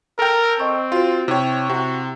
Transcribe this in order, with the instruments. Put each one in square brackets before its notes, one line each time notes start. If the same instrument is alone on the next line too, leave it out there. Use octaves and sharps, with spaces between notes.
[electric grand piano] A4 G5 [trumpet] A#4
[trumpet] C4 [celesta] D#5 C#6
[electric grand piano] F4 [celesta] F#4 C5
[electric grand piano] C3 C#5 [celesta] E4 G5
[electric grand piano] C3 [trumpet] F#4